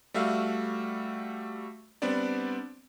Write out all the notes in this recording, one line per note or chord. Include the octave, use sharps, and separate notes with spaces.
G3 A3 F#4 E5 F5
G3 B3 C4 D4 D5